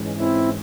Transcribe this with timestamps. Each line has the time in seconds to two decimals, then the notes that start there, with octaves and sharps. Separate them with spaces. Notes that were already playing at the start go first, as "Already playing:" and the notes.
Already playing: G#2 E3 G#3 C#4
0.18 C4 E4